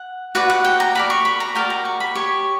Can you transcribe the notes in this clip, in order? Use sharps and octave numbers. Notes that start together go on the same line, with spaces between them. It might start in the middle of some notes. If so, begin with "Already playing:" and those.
Already playing: F#5
F#4 B4 D5 F#5
F#5
G5
A#5
F#4 A#4 D5 B5
C#6
B5
A#5
F#4 A#4 D5 G5
A#5
C#6
B5
G4 C#5 C#6